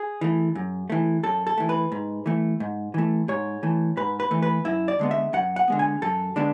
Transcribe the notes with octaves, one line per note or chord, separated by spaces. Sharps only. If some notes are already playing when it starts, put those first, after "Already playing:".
Already playing: G#4
E3 A3
F#2
E3 A3
F#2 A4
A4
E3 A3
B4
G#2
E3 A3
G#2
E3 A3
G#2 C#5
E3 A3
G#2 B4
B4
E3 A3
B4
F#2 E4
D5
D3 G#3 B3
E5
F#2 F#5
F#5
D3 G#3 B3
G#5
F#2 A4
D3 G#3 B3 D4